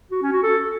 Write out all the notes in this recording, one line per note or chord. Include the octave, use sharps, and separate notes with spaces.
F#4
C#4
F#4
A4